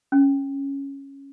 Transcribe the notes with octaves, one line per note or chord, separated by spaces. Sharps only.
C#4